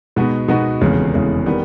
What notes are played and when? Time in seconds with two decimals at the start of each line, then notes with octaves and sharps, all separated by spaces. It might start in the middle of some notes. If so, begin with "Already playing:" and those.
0.16 B2 G#3 B3 D#4 F#4
0.48 B2 G#3 B3 D#4 F#4
0.81 F1 E2 C#3 E3 G#3
1.14 F1 E2 C#3 E3 G#3
1.46 D#3 G3 B3